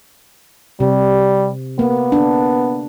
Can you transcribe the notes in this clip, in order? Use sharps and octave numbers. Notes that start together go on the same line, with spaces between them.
C3 G3
A#3 B3
D4